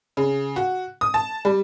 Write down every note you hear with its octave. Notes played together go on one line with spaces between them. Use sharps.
C#3
F#4
D#6
A5
G3